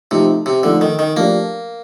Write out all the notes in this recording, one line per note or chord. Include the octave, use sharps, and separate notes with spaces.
C3 F3 A3 D#4
C3
D3 F3 A3 D#4
D#3
D#3
F3 A3 A#3 D4 G4